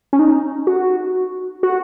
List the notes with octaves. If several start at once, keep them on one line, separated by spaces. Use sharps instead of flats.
C#4
D#4
F#4
F#4